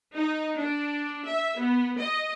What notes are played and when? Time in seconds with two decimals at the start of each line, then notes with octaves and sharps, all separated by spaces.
0.15 D#4
0.58 D4
1.26 E5
1.58 B3
1.99 D#5